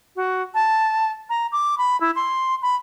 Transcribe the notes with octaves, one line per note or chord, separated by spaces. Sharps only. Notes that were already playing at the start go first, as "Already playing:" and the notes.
F#4
A5
A#5
D6
B5
E4
C6
B5